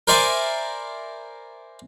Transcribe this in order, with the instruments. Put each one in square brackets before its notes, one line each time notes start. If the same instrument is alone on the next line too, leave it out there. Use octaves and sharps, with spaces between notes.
[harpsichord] A#4 C5 D5 E5 G#5 B5